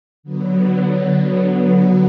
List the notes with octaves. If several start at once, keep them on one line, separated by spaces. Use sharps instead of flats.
D3 F#3 B3